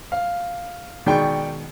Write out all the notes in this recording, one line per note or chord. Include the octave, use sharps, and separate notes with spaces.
F5
B2 D#3 G#3 D5 G5 C#6